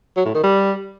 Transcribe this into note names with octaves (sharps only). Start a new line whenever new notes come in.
F#3
A2
D#3
G3